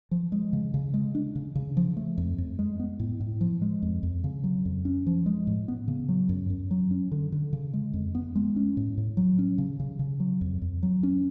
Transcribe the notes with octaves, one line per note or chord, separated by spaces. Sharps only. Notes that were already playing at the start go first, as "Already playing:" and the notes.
F3
G#3
C#3
C#3
G#3
D4
C#3
C#3
F3
A3
F2
F2
G#3
B3
A2
A2
F3
G#3
F2
F2
C#3
F#3
F2
C#4
F3
G#3
A2
B3
C#3
F#3
F#2
F#2
F#3
C#4
D3
D3
C#3
G#3
F2
B3
G#3
C#4
A2
A2
F#3
C#4
C#3
C#3
C#3
F#3
F2
F2
F#3
C#4